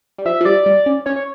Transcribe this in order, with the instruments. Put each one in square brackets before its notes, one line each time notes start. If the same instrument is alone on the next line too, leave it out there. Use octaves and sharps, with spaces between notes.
[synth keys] G3
[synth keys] F3 [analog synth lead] E5
[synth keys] F3
[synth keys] G3 [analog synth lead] D5
[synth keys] G3
C#4
[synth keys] C#4 [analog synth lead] C#5
[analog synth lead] C#5